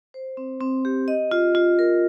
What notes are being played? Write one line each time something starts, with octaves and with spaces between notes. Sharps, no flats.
C5
C4
C4
G4
D#5
F4
F4
A#4